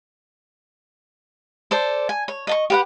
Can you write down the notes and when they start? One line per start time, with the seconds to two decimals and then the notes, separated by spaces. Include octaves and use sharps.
1.71 A4 C5 D5
2.09 G#5
2.28 C#5
2.47 D#5 A5 C#6
2.70 G4 B4 F#5